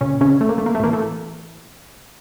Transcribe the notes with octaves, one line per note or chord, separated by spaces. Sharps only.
A#2 C#3 C#4
C#3 C#4
A3
A#3
A3
A#3
A3
A2 E3 A#3
A3